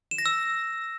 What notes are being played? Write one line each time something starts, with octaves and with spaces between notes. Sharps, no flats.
E7
A#6
E6